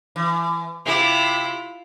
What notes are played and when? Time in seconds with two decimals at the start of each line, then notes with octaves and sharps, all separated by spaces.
0.16 E3
0.86 C3 E4 F4 G4